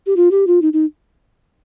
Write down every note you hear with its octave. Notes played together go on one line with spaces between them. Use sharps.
G4
F4
G4
F4
D#4
D#4